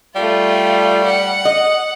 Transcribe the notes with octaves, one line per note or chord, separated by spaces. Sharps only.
G3 A3 F4
F#5
D#5